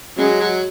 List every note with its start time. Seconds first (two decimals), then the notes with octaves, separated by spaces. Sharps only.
0.18 C#3 F#3 G#3
0.40 F#3